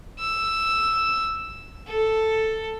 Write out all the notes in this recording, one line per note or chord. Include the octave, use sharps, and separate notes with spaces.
E6
A4